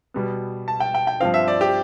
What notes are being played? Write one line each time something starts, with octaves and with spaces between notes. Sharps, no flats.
B2 G3 B3
A5
G5
G5
G5
G2 F3 C4 F5
E5
D5
G4